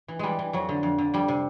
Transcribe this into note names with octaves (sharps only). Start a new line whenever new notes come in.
E3
E3 G3 G#3
E3
F2 F#3
D3
F2
D3
F2 G3
C3